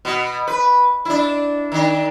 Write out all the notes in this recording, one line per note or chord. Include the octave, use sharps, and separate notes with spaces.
B2
B4
D4 E4
D#3 D4